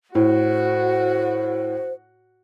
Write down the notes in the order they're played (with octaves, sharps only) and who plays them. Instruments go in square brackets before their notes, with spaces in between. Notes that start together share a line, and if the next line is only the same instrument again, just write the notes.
[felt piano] A2 [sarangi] F#4 [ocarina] C5